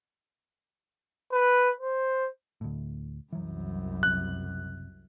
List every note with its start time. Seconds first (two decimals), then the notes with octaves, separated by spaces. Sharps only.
1.32 B4
1.80 C5
2.61 D2 A2
3.32 C2 F#2 E3 F#3
4.03 F#1 C3 F#6